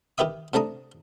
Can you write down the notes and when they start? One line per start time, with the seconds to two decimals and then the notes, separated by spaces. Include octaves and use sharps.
0.18 D#3 G4 B4 E5 D#6
0.54 C3 A3 D4 A#5 D#6